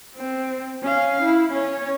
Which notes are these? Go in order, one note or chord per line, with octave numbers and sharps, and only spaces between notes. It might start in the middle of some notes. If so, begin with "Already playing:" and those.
C4
C#4 F5
E4
C#4 C#5